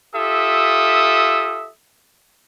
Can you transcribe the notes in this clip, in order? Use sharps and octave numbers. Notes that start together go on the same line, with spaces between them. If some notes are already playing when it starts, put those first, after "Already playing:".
F4 G4 A4 E5 D#6